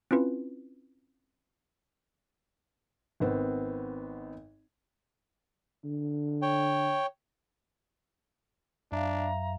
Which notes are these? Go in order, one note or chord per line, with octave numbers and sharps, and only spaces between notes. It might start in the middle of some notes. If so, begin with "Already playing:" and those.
C4 C#4 E4 F4 B4
G#1 B3 C4
D3
C#5 G5
F#2 D4 E5 F5 A#5